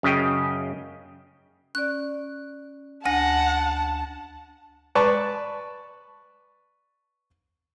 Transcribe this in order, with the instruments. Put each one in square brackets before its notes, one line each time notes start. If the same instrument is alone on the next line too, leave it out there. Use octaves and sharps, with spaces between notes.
[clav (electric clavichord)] F#2 C#3 D#5 G5
[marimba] C#4 D5 [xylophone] F#6
[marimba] D2 [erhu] F#5 [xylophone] G#5 A#6 [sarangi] A5
[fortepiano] B4 D5 A5 C#6